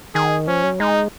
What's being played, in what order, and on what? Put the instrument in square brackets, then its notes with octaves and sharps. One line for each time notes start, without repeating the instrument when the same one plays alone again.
[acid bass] D#3 [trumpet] G#4
[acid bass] F3 [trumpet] C#4
[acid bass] F#3
[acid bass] G#3 [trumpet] D#4